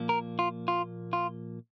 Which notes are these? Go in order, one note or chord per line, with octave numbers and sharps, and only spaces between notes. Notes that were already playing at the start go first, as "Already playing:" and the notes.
Already playing: A#2 F3 A#3
A#4
F4
F4
F4